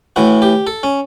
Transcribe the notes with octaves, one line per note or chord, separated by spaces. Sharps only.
A2 E3 F#4
G4
A4
C#4